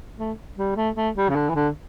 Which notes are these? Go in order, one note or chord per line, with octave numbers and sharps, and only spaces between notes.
A3
G3
A3
A3
G3
C#3
D3
E3
D3